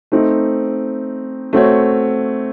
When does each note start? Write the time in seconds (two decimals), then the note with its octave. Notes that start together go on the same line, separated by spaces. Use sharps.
0.12 A3 C4 D#4
1.53 A3 C4 F#4 C#5